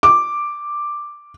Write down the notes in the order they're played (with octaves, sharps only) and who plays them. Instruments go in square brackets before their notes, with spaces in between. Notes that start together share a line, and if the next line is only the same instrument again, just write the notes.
[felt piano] D6